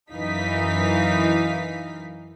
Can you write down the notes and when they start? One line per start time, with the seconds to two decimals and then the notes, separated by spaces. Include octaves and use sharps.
0.14 F#2 E3 D#4 F5 B6